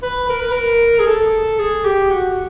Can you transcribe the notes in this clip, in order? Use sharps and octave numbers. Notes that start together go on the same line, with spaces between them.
B4
A#4
B4
A#4
G#4
A4
G#4
G4
F#4